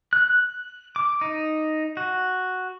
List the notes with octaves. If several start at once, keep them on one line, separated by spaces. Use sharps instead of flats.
F#6
D6
D#4
F#4